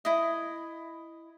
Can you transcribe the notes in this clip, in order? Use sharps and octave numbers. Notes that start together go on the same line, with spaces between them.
E4 D#5